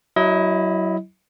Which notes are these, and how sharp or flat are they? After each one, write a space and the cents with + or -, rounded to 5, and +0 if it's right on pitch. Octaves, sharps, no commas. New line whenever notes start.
F#3 +20 E4 +0 D#5 +30